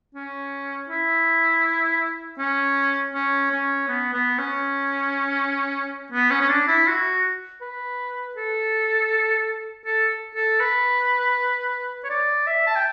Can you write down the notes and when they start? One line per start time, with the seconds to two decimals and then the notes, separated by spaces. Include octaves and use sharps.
0.15 C#4
0.89 E4
2.39 C#4
3.14 C#4
3.51 C#4
3.88 B3
4.14 B3
4.39 C#4
6.12 B3
6.31 C#4
6.41 C#4
6.49 D4
6.68 E4
6.88 F#4
7.62 B4
8.37 A4
9.86 A4
10.35 A4
10.60 B4
12.04 C#5
12.10 D5
12.47 E5
12.67 A5
12.76 G5